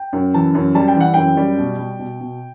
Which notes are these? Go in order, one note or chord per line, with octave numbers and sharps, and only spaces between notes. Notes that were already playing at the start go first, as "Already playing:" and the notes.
Already playing: G5
F#2
E3 A5
F#2
G3 A5
G5
E3 F#5
F#2 G5
G3
B2
G3
B2
B2